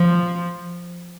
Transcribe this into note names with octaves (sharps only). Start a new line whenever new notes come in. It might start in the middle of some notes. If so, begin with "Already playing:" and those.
Already playing: F3